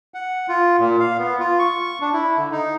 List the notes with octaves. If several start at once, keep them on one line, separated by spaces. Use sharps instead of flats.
F#5
F4
A#2
F5
B3
F4
C#6
D4
E4
D3
D#4